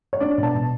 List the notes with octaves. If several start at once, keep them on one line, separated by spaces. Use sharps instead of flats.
C#5
D4 D5
B2
A5
B2